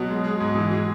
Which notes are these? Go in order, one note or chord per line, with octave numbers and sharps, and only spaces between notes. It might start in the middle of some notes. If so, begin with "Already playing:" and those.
Already playing: B2 F#3 B3 F#4
G#3
G#3
G#2
E3
G#3 F#4